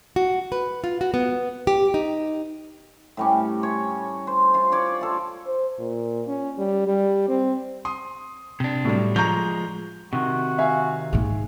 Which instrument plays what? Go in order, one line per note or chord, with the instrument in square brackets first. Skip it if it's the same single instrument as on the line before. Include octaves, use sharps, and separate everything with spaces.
[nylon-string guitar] F#4
B4
F4
F#4
B3
G4
D#4
[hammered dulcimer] A2 G3 C#4
C#5
C5
F4 F5
C#5 D5 D6
F4 A4
[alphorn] C5
A#2
C#4
G3
G3
C4
[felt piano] C6 D#6
[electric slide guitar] C3 D4
[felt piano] A2 F#3 G3
[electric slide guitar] F3 G#3 [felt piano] A#5 C#6 G6
[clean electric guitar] C3 D#3 [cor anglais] F#4
[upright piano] E5 F5 G#5
[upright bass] G#2 G#3